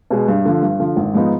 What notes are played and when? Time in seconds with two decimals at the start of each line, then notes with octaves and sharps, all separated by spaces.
0.10 B2 G#3
0.28 G2
0.45 D3 F3
0.62 G2
0.80 D3 F3
0.96 G#1
1.14 G#2 F3 B3 D#4